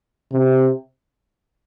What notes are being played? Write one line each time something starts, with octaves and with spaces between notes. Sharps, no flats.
C3